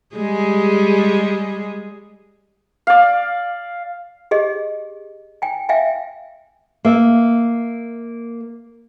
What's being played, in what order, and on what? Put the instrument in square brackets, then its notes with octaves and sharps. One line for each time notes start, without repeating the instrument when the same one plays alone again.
[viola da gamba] G3 G#3 G#4
[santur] D5 F5
[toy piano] G4 G#4 D#5
G5 G#5
E5 F5 G5 G#5
[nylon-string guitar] A#3 E5